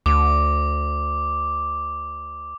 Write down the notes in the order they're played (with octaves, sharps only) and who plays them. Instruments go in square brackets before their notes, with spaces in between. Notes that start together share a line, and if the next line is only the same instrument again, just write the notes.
[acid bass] D2 [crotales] D6